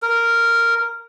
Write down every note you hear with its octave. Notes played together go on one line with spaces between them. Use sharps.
A#4